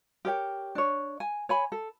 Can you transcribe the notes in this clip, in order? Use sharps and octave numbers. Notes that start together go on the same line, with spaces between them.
G4 A#4 C#5 G5
D4 C#5
G#5
C#5 G#5 B5
A4